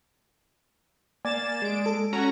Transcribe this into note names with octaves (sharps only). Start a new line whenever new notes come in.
A#3 D5 G#5 A6 E7
G#3 D7
A4
C#4 F#4 A#5